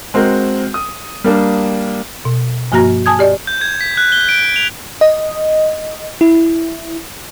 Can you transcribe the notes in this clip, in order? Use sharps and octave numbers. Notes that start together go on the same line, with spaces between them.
G#3 C4 F#4 A#4
D#6
G3 A#3 D4
B2
G2 F3 A#3 F#4 A#5 A#6
G#5 A5 D#6 G#6
G4 D5 D#5
G6
G#6
B6
F#6
G7
D7
F7
D#5
E4